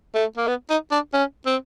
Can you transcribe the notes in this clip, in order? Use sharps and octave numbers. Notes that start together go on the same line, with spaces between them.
A3
A#3
B3
D#4
D4
C#4
C4